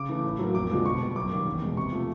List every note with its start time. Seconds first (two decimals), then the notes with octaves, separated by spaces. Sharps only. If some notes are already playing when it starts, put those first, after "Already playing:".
Already playing: C#3 D6
0.09 E3 A3
0.24 A2
0.39 F#3 A#3
0.54 F2 D6
0.70 D3 F3 G#3 B3
0.85 B2 C#6
1.00 G3 B3
1.16 F#2 D6
1.31 D#3 G3 A#3
1.46 E2
1.62 B2 G#3
1.76 C3 C#6
1.92 F3 A3